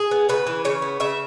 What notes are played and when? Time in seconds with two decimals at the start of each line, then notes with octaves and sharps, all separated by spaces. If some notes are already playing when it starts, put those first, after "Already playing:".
Already playing: G#4
0.11 B3
0.29 C#3 B4
0.47 E3
0.65 C#3 C#5
0.82 B3
1.00 C#3 E5